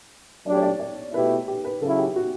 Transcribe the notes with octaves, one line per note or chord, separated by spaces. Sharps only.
F#3 A3 D4 G4 D5
C#5
D5
D5
B2 A3 E4 G4 B4
G4
B4
C#3 F#3 C#4 E4 A4
G4
F#4